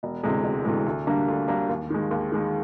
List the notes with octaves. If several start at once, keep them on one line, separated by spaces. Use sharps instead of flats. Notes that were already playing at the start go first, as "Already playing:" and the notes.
E1
D2 C3 E3 G#3
E1
D2 C3 E3 G#3
D2
D3 G3 A#3 D4
D2
D3 G3 A#3 D4
D#2
D#3 G#3
D#2
D#3 G#3